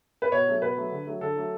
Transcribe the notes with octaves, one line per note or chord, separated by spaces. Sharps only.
B4
B2 C#5
F#3 A3
B2 B4
F#3 A3
D3
F#3 A3
D3 A4
F#3 A3